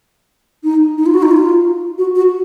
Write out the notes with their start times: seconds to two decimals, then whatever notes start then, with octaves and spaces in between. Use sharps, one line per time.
0.64 D#4
0.98 D#4
1.06 F4
1.14 F#4
1.22 D#4
1.31 F4
1.98 F#4
2.15 F#4